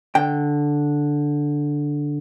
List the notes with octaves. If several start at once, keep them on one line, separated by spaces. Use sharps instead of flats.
D3 G5